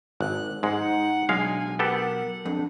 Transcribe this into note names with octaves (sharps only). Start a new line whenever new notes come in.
G#1 F#6
G#2 G#3 D#4 F#5
B1 G#3 D4 F5 G#5
B3 G4 A4 A#4 F#5
F2 D4